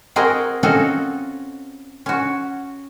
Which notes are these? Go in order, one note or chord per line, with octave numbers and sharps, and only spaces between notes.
C4 F#4 G#4 A#4 D#5
C4 C#4 F4 F#4 A4 D#5
C#4 F#4